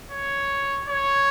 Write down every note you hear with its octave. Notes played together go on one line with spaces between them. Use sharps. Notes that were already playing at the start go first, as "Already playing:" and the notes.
C#5
C#5